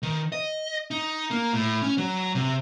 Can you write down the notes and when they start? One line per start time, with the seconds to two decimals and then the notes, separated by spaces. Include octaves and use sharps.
0.03 D#3
0.32 D#5
0.91 D#4
1.30 A#3
1.53 A2
1.82 C#4
1.98 F#3
2.35 C3